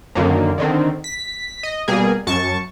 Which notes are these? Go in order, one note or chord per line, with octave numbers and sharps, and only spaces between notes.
F#2 D3 D#3 A#3
D3 D#3 C4
B6
D#5
B2 G3 A#3 G#4
F#2 A5 C#6